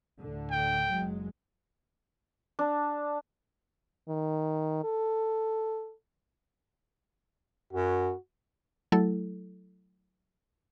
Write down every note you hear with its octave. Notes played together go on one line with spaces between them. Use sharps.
D2 A2 D3
G5
F#1 F#3 G#3
D4
D#3
A4
F#2 F#4
F#3 A3 E4 A4